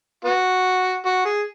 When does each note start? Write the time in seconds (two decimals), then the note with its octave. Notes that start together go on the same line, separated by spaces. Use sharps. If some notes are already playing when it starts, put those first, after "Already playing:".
0.25 B3 F#4
1.05 F#4
1.25 G#4